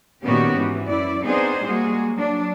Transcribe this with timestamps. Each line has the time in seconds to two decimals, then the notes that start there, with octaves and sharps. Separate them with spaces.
0.24 A#2 D#3 B3 C#4 F#4 G4
0.54 G#2 E3
0.87 F#2 E4 D5
1.23 B3 C4 D4 D#4 G#4 C5
1.64 G3 G#3 A#3 F#4 G#4
2.16 F#3 D4